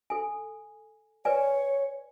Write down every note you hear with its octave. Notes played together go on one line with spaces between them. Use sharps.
A4 G#5
B4 C#5 D5 G#5